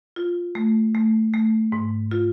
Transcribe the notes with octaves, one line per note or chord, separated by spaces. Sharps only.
F4
A3
A3
A3
G#2
F4